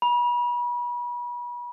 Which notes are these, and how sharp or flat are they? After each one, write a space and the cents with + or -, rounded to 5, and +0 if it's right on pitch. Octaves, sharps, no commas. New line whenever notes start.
B5 -35